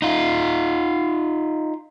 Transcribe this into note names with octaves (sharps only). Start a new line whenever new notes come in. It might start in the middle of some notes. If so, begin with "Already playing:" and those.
D#4 F4